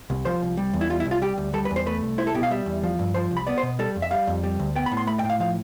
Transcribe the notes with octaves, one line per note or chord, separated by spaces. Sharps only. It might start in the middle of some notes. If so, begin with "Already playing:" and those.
C2
F3 C5
C2
G3
E2
E4
G3 F4
E4
C2
F4
G3 G4
D2
G3 A4
B4
E2
C5
A3 B4
C2
E4 C5
A4
B2 G4
F5
G3 E5
E2
F3
G2
F3 C5
C2
B5
B3 D5
C5
B2
G3 A4
F2
E5
G3 F5
F2
G3
D2
B3 G5
B5
A2
C6
A3 B5
G5
A2
F5
F3 F5